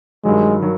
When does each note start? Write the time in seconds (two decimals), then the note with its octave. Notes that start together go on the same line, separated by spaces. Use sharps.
0.25 G2 D#3 F#3 G#3
0.62 D#3 F#3